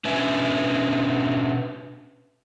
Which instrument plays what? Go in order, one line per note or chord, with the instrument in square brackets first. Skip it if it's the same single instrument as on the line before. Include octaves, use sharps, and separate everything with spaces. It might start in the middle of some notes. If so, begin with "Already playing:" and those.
[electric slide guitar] B2 C#4 D4 B4 E5 G#5